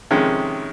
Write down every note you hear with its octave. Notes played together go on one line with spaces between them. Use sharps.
F2 C3 D#3 G#3 C#4